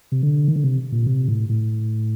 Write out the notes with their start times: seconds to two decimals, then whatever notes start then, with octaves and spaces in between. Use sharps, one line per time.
0.12 C3
0.23 D3
0.48 D#3
0.56 D3
0.64 C3
0.92 A#2
1.07 C3
1.28 A2
1.49 A2